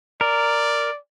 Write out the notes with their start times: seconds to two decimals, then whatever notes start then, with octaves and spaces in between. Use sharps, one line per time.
0.21 A#4 D5